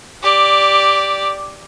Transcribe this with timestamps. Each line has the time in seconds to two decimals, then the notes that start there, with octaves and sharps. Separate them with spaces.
0.23 G4 D5